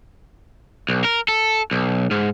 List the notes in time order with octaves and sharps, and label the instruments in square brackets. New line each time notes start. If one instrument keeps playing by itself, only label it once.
[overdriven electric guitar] B1
A#4
A4
B1
G#2